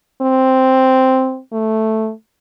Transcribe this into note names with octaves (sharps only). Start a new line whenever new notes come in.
C4
A3